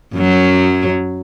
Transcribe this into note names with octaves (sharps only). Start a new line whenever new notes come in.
F#2 F#3